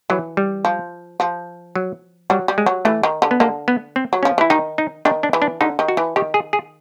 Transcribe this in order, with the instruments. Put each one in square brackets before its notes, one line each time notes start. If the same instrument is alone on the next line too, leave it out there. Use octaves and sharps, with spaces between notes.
[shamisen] E3 [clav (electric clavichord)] F#3
[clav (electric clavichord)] G3
[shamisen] F3
F3
[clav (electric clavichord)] F#3
[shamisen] F#3 [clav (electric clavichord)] G3
[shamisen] G3
[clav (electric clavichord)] G#3
[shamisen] F#3
[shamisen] E3 [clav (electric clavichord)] A3
[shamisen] D#3
D3
[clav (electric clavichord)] B3
[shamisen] D3 [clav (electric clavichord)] A#3
[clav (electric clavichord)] B3
C4
[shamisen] F#3
[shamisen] F3 [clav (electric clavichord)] C#4
[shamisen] E3 [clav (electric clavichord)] E4
[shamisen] D#3 [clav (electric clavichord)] D#4
[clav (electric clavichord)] D#4
[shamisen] D#3 [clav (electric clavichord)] D4
[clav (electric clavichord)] D4
[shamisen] E3
[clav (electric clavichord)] D4
[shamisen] D3 [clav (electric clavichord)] D#4
[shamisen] D#3
[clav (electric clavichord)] F#4
[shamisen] E3
[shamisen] D#3 [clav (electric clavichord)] G4
[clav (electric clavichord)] G#4
G#4